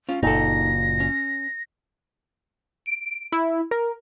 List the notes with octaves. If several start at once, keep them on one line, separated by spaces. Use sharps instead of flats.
C#4 F4
F#1 A#2 D#4 A4 A#6
C#4
D7
E4
A#4